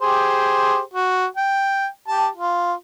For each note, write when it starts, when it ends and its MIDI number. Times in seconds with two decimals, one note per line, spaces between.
0.02 0.79 67
0.02 0.79 68
0.02 0.79 72
0.94 1.26 66
1.37 1.86 79
2.08 2.28 67
2.08 2.28 81
2.36 2.73 65